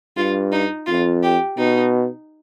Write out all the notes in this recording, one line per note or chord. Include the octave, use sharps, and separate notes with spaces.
G2 F4
D#4
F2 F4
G4
B2 D#4